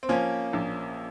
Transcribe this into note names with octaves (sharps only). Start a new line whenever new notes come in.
C4
F3 A#3 C#4
A#1